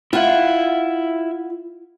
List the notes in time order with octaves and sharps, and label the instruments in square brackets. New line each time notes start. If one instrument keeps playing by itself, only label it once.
[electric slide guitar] E4 E5 [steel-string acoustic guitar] F4 F#5